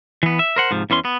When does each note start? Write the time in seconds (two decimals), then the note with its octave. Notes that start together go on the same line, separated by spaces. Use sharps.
0.23 E3 B3
0.39 E5
0.56 A#4 C5 F#5
0.71 G#2 C3 F3
0.90 E2 E3 C#4 C6
1.05 B3